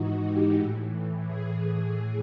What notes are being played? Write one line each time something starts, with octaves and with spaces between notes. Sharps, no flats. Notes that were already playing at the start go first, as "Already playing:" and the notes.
Already playing: G#2 E3 D#4 F#4
G4
A2 E3
G#4